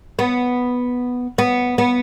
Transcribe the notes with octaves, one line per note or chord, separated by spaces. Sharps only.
B3
B3
B3